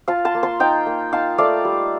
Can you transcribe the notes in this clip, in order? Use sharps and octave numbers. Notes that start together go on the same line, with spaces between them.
F4 F5 A5
A5 C6
A#3
A5 C6
D#4 G5 A#5
A#3
D#4 F5 A5
A3 D5 F5
G3